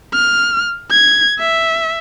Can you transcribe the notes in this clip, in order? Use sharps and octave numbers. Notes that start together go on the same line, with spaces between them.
F6
G#6
E5